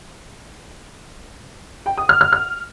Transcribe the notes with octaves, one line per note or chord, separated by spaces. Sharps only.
G5
D#6
F6
F6
F6